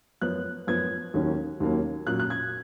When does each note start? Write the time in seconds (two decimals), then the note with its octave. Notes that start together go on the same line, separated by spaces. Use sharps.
0.22 F#2 F3 B3 F#6
0.67 F#2 F3 B3 G#6
1.14 D#2 D#3 F#3 A#3 C#4
1.60 D#2 D#3 F#3 A#3 C#4
2.07 A#2 F#3 A#3 C#4 F#6
2.20 F#6
2.30 G#6